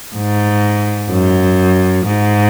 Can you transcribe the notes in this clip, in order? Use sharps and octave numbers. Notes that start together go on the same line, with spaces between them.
G#2
F#2
G#2